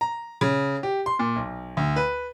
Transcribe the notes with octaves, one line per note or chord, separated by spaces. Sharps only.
A#5
C#3
G4
C6
A#2
B1
D2
B4